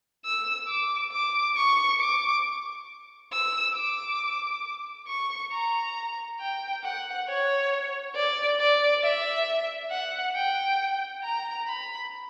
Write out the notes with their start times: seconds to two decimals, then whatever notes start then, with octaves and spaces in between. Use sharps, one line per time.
0.25 E6
0.68 D6
1.12 D6
1.56 C#6
2.00 D6
3.32 E6
3.76 D6
5.08 C#6
5.52 A#5
6.40 G5
6.83 F#5
7.28 C#5
8.15 D5
8.59 D5
9.03 E5
9.91 F#5
10.35 G5
11.23 A#5
11.67 B5